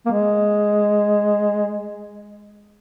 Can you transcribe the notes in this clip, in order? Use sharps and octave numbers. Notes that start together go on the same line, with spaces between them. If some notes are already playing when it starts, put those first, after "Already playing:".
A#3
G#3